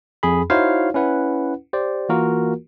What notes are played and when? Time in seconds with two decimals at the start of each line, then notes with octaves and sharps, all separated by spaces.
0.23 F2 G#4 B5
0.50 D#4 E4 F#4 C5 C#5 F5
0.94 C#4 E4 B4 F#5
1.73 G4 C5 D5
2.09 E3 A#3 F4 F#4 A#4